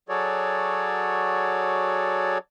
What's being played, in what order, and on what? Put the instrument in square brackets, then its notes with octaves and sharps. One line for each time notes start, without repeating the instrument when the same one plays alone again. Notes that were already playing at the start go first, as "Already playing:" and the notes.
[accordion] F#3 F#4 G#4 A4 C#5 D5